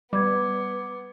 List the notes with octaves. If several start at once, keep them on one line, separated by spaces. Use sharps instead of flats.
G3 B3 D6 G#6